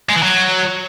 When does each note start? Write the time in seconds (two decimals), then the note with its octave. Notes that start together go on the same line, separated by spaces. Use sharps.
0.09 G#3
0.16 E3
0.22 F#3